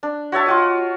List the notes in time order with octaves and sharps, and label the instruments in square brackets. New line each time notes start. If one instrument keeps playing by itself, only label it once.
[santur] D4
F#4 C#5 E5 A5
F4 F#4 D#5